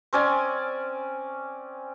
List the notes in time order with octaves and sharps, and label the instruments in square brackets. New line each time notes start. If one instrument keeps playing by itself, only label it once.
[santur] C4 C#4 D5 G#5